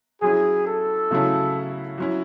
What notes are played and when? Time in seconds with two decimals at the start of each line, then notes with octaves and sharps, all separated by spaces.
0.22 F#3 C#4 E4 G#4
0.66 A4
1.11 C#3 F#3 A3 C#4 E4
1.98 F#3 C#4 E4